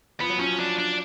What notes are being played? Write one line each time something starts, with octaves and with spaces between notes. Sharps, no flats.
F3 B3
F#3
F3 C#4
D4
D4